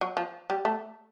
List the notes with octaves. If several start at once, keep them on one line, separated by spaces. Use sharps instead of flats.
F#3
F3
G3
A3